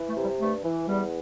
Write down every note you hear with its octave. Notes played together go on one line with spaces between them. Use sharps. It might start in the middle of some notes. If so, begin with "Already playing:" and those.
Already playing: E3
A3
C3
G3
G2 A3
E3
E2 G3